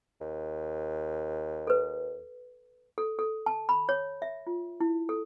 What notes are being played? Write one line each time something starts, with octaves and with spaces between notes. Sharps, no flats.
D#2
A4 B4
A4
A4
A5
B5
C#5
E5
F4
E4
A4